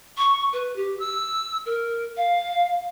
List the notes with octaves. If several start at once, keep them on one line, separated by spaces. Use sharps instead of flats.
C#6
B4
G4
E6
A#4
F5